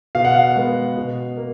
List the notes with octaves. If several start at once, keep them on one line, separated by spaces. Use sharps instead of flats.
B2 F5
F#5
F5
G#3 B3
B2
A#3